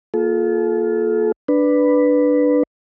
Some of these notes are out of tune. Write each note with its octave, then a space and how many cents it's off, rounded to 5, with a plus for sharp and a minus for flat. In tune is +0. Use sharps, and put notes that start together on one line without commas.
A#3 +0 F4 +15 A4 -35
D4 +5 B4 +0